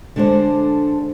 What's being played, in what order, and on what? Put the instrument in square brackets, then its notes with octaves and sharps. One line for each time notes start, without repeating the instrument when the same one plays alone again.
[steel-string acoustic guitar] D3 G#3 D4 A4 C5